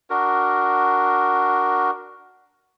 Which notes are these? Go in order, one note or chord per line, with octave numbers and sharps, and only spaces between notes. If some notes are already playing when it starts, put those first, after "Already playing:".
D4 F#4 A#4